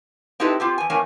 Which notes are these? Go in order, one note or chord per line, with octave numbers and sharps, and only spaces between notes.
C4 D#4 E4 G4 A4 B4
C4 F4 G4
E2 G#5
E2 A2 A#3 C#4 G#5